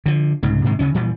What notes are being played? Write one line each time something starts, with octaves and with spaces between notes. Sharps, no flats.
D3 F3
C2 G#2 C#3
G#2 C3 D#3 G#3
D2 C#3 C#4
A#2 E3 F3 G3